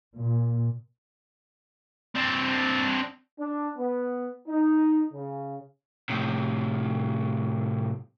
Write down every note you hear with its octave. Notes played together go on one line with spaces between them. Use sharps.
A#2
C4 D4
D4
B3
D#4
C#3
A2 C3